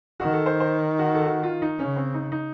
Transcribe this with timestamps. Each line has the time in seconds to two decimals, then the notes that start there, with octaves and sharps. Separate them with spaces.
0.20 D#3 F#4
0.33 A4
0.46 C5
0.60 C5
0.99 F#4
1.15 A4
1.25 F#4
1.43 F4
1.62 D#4
1.79 C#3 C#4
1.96 C4
2.14 D#4
2.32 D#4